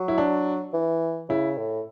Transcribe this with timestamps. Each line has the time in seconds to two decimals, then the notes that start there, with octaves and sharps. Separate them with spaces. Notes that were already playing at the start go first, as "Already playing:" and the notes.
Already playing: F#3
0.08 E4
0.18 D4
0.74 E3
1.29 C#3 E4
1.57 A2